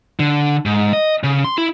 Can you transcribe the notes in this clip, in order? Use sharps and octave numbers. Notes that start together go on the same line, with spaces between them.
D3
G#2
D#5
C#3
C6
E4